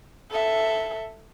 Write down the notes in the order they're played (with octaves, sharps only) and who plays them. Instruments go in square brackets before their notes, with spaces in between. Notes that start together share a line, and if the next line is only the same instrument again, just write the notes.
[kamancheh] A4 E5